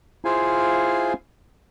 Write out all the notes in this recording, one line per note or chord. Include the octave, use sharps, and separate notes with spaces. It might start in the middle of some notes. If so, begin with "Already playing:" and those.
E4 F4 G#4 C5 F5 G#5